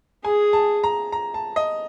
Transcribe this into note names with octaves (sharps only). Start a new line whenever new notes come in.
G#4 G#5
A5
A#5
A#5
A5
D#5